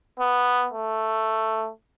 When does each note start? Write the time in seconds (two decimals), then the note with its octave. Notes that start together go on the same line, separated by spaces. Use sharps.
0.20 B3
0.73 A3